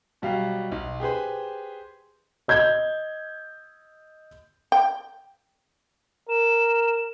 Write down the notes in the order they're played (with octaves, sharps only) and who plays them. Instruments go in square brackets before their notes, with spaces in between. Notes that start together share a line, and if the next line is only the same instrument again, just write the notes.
[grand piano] B2 F#3 G3 G4 F5
B1
G4 G#4 B4 C5
D#5 G6 G#6
[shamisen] G5
[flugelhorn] A#4 [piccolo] E7